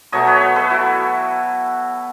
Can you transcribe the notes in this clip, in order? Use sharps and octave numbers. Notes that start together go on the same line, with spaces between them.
B2 F#3 A3 C#5 D#5
B4 C#5
B4 C#5
A4 B4
E4 F#4